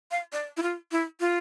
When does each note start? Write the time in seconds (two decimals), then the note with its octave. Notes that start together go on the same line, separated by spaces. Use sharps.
0.11 F5
0.33 D5
0.57 E4
0.62 F4
0.92 E4
1.20 F4